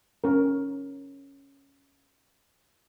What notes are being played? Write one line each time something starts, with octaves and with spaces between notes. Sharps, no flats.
C#4 A#4